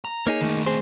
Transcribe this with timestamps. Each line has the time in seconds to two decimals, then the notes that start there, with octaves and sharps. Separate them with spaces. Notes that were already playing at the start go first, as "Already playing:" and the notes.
0.05 A#5
0.27 A#3 D#4 G#4 C#5
0.41 D#3 A3
0.66 C4 G#4 C5